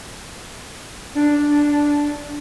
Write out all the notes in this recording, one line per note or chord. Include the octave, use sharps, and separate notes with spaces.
D4